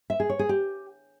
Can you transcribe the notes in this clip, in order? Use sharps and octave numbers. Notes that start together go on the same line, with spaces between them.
E5
G#4
C#5
G#4
G4